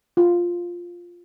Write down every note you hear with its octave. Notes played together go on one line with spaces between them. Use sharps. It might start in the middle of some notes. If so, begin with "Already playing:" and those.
F4